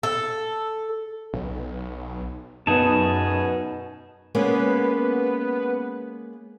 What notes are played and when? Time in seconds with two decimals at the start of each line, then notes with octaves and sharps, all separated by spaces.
0.03 A4
1.33 B1
2.67 F#2 B2 B3 D#4 G#4 A5
4.35 G#3 A#3 B3 C#4 B4